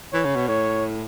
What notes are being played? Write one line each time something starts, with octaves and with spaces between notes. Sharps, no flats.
E3 C#5
C#3
B2
A2 C#5